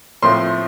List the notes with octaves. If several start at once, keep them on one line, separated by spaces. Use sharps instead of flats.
A2 F3 A3 C4 C6